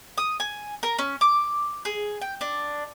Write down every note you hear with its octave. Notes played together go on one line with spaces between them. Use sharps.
D#6
G#5
A#4
C#4
D6
G#4
G5
D4